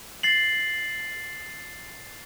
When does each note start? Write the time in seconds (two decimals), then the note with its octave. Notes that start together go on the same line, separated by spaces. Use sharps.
0.23 A6 C7 F#7